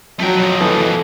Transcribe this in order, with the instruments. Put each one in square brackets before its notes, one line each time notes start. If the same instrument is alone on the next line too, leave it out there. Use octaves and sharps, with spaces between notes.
[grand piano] F3 F#3 [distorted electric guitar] A3 G5
[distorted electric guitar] F2 B2
[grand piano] E3 F3 A3